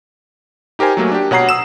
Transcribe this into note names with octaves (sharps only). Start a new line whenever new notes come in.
D#4 G4 A#4 C5 G#5
F#3 A3 A#3
D4 G4
B2 C#5 F#5 A#5 C7
D#6 E6 E7